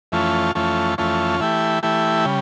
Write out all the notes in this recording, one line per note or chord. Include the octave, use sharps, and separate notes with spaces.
F2 E3 A3 C#4 F4
F2 E3 A3 C#4 F4
F2 E3 A3 C#4 F4
E3 A3 E4 G4
E3 A3 E4 G4
C#3 G3